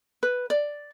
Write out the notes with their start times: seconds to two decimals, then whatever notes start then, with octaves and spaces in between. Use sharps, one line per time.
0.23 B4
0.50 D5